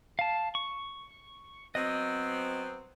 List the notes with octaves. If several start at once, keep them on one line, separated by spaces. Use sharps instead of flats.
F5 A5
C#6
F#3 B3 C4 D#5